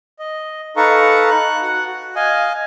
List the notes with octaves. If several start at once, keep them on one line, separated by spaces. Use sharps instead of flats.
D#5
D#4 A4 B4 F5 A#5 C#6
F#6
F#4 F#5
F#4
D#5 F5 G#5